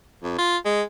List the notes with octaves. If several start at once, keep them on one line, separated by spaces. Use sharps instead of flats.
F2
F4
G#3